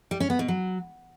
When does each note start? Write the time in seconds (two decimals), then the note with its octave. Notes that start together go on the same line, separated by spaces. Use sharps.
0.11 G3
0.20 C#4
0.30 B3
0.39 B2
0.48 F#3